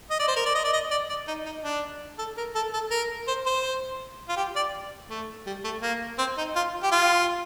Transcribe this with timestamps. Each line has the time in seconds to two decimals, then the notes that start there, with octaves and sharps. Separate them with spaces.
0.10 D#5
0.19 D5
0.28 C5
0.36 A#4
0.46 D5
0.55 D#5
0.64 D5
0.73 D#5
0.91 D5
1.09 D5
1.27 D#4
1.46 D#4
1.64 D4
2.19 A4
2.37 A#4
2.55 A4
2.73 A4
2.91 A#4
3.27 C5
3.46 C5
4.29 F4
4.37 G4
4.56 D5
5.10 A3
5.46 G3
5.64 A3
5.82 A#3
6.18 C4
6.38 D#4
6.56 F4
6.83 G4
6.92 F4